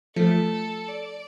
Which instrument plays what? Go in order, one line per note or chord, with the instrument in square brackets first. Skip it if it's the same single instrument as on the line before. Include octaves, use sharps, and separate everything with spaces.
[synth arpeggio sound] F3 A3 [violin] A4
[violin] D5